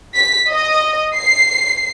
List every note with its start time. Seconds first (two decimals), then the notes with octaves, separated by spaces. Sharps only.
0.16 B6
0.50 D#5
1.16 C7